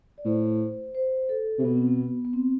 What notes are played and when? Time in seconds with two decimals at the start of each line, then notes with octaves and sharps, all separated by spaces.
0.18 D5
0.25 A2 C5
0.95 C5
1.29 A4
1.58 C3
1.64 B2 B3
1.76 C4
1.88 B3
2.25 B3
2.33 C4